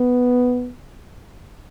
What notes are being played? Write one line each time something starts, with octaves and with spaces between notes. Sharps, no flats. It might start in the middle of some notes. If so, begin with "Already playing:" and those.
Already playing: B3